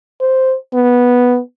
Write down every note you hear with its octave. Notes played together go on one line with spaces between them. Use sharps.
C5
B3